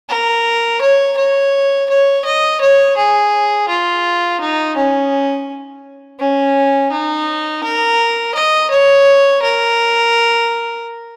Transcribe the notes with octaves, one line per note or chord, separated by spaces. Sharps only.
A#4
C#5
C#5
C#5
D#5
C#5
G#4
F4
D#4
C#4
C#4
D#4
A#4
D#5
C#5
A#4